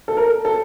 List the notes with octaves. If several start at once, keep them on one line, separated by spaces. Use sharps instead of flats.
A4
A#4
A4